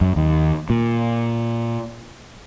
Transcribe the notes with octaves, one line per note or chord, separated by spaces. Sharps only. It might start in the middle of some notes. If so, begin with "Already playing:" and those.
F#2
D#2
A#2